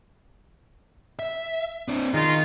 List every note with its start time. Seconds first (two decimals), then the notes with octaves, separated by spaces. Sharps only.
1.19 E5
1.88 C4 D4
2.14 D#3 G#3 D#4 F4